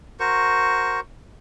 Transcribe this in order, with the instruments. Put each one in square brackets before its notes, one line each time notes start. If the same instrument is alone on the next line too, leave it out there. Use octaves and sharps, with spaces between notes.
[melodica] F#4 A#4 C5 C#6